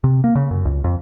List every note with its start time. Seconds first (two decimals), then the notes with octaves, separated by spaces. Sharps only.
0.04 C3
0.24 A#3
0.35 C#3
0.51 F#2
0.65 C#2
0.84 F2